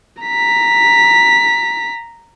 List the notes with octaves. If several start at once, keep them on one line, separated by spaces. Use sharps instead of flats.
A#5 B6